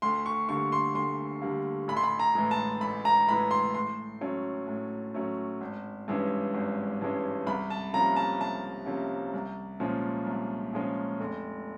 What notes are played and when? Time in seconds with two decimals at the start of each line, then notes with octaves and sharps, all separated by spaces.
0.02 D2 C6
0.26 C#6
0.49 D3 G3 A#3 C#6
0.72 C6
0.95 D2 C6
1.42 D3 G3 A#3
1.88 A1 B5
1.97 C6
2.04 B5
2.19 A#5
2.35 A2 E3 G#3
2.51 A5
2.81 A1 B5
3.05 A#5
3.28 A2 E3 G#3 B5
3.51 C6
3.74 A2 C6
4.21 F#3 A3 C#4
4.67 A2
5.14 F#3 A3 C#4
5.61 G#1
6.08 G2 E3 G#3 C#4
6.54 G#1
7.01 G2 E3 G#3 C#4
7.47 C2 B5
7.70 A5
7.93 C3 F3 A#3 C#4 A#5
8.16 A5
8.40 C2 A5
8.86 C3 F3 A#3 C#4
9.34 C2
9.80 A#2 F3 G#3 C#4
10.26 C2
10.73 A#2 F3 G#3 C#4
11.20 F1